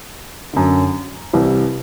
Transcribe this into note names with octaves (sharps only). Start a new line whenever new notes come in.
F#2 D3
C2 C3 E3